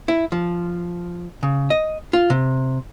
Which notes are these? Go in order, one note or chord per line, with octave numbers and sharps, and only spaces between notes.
E4
F3
C#3
D#5
F4
C3